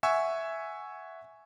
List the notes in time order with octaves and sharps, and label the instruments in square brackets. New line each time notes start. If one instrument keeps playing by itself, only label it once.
[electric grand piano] E5 F#5 G#5 C#6 E6